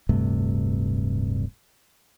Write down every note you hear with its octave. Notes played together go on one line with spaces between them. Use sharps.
D1 G2 C3 A3